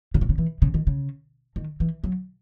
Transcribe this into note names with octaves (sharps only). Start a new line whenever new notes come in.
C#3
C3
C#3
E3
C#3
D#3
C#3
D#3
E3
F#3